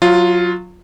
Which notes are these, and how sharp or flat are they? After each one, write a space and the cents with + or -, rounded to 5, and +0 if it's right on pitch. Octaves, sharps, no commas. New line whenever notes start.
F#3 -20 F4 +0